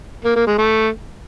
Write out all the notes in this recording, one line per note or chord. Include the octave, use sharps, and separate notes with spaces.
A#3
A#3
G#3
A3